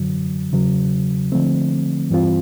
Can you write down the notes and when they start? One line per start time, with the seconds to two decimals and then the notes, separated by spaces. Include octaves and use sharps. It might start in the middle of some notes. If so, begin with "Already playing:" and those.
Already playing: F#2 D3 F#3
0.53 E2 C#3 F#3
1.32 D3 F3 A3 C4
2.10 G2 E3 G3 C4 F4